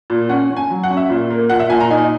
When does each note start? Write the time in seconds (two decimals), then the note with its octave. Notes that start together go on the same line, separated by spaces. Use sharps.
0.10 A#2
0.29 C#4 F#5
0.50 C#4
0.57 G#5
0.70 F#3
0.83 F#5
0.91 C#4
0.97 E5
1.09 A#2
1.30 A#3
1.50 A#2 F#5
1.60 E5
1.70 A#2 G#5
1.80 A#5
1.91 D#4 G#5